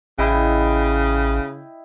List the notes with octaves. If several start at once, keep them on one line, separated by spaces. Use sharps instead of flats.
A1 C#3 E4 D#5 G5